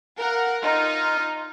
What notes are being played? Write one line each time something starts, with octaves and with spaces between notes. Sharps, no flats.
A#4 F5 F#5
D#4 F4